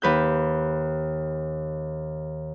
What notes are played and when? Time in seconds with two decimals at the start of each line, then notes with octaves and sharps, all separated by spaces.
0.02 D#2 B4 G6